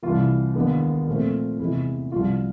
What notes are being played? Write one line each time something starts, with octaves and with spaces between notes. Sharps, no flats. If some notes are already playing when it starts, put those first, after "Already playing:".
C2 C3 E3 F4
D#2 D#3 G#3 B3 D4
A#2 F3 A3 C4
E2 C3 E3 G#3 E4
C2 C3 F3 F4